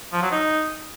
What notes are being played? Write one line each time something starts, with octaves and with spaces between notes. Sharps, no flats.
F3
F#3
D#4